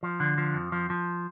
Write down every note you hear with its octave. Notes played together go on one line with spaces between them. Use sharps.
F3
D3
F3
F2
F3
F3